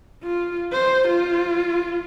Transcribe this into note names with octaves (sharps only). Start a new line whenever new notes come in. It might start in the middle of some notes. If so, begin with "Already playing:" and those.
F4
C5
F4